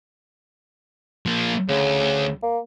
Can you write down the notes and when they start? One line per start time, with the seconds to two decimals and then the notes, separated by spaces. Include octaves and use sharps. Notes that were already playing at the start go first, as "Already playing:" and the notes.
1.26 F3 A#3
1.69 D2 C#3
2.42 A#3